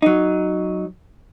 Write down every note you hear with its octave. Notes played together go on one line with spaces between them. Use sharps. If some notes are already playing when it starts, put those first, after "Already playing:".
F#3 D#4